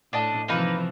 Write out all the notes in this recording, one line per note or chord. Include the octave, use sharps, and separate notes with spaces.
A2 D4 D#5 A5
C3 E3 F3 A#3 D#4 B4